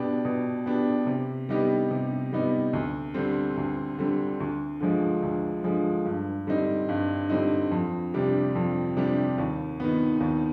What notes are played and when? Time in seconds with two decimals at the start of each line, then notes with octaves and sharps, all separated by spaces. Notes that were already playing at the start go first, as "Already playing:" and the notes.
Already playing: B2 B3 D4 G4
0.25 B2
0.66 B3 D4 G4
1.07 C3
1.49 G3 B3 D#4 G4
1.91 C3
2.32 G3 B3 D#4 G4
2.73 D2
3.14 D3 G3 C4
3.57 D2
3.98 D3 G3 C4
4.40 D2
4.80 D3 F3 G#3
5.22 D2
5.64 D3 F3 G#3
6.05 G2
6.47 D3 G3 C4 D#4
6.89 G2
7.30 D3 G3 C4 D#4
7.71 F2
8.14 C3 G3 D4 G4
8.55 F2
8.97 C3 G3 D4 G4
9.38 D#2
9.80 D#3 B3
10.20 D#2